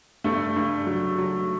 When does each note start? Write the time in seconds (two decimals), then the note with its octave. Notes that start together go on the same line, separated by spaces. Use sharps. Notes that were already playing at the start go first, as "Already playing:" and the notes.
0.24 G2 A3
0.56 G2
0.87 F#3
1.18 F#3